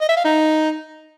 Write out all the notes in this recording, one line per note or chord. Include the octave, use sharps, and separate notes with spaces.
D#5
E5
F5
D#4